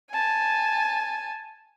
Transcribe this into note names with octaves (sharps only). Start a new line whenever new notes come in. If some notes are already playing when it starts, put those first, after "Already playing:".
G#5 A5